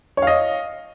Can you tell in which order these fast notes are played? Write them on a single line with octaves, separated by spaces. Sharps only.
C#5 F5 D#5